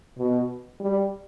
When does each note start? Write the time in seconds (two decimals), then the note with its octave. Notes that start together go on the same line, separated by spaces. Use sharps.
0.19 B2
0.81 G3